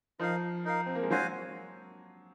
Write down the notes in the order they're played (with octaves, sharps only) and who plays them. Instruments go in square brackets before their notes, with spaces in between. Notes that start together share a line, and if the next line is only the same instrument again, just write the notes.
[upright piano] F3 [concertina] D#4 A#4 F5
[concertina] D#4 A#4 F5
[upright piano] C4
A#3
G#3
[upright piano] F#3 [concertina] F#4 C5 F5 G#5